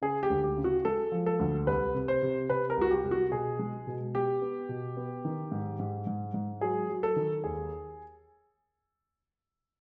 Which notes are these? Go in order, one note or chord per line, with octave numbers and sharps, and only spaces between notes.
C#3 G#4
G4
D2
G4
C#3
F#4
G#3 A4
F3
A4
D2
C2 B4
C3
C5
C3
C3 B4
A#4
C2 F#4
G4
C2
F#4
B2 G#4
G#3
B2
B3 G4
B3
B2
B3
D#3
G#2
G#2
G#2
G#2
F#3 G#4
F#3
A4
D#3
D#2 G#4